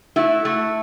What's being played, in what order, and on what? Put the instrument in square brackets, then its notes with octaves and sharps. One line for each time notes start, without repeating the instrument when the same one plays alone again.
[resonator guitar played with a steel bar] A3 E4 F#4
A3